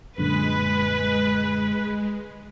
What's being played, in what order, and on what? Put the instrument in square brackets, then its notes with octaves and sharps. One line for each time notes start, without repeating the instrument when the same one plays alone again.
[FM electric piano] F#2 A#2 D3 [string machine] G#3 [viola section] B4